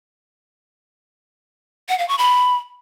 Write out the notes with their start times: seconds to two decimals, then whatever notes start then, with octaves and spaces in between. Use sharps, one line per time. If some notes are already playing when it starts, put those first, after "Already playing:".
1.89 F#5
1.99 F5
2.08 C#6
2.18 B5